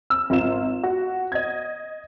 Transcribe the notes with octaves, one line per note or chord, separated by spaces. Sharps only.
E6
G#1 F4 E7
F#4
D#5 G#6